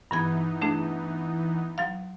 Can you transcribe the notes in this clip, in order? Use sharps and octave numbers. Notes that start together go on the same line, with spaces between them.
G2 E3 B3 D#4 B5 G#6
A3 D4 G#4
F#3 F5